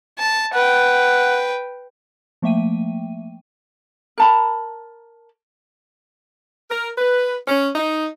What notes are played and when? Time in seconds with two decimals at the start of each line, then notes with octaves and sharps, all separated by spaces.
0.19 A5
0.54 B4 F#5 G5
2.42 F3 A3 A#3 E5 G5 D#7
4.18 A#4 A5 B5
6.70 A#4
6.97 B4
7.47 C#4
7.75 D#4